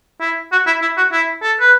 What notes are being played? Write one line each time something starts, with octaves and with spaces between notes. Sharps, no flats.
E4
F#4
E4
E4
F#4
E4
A4
B4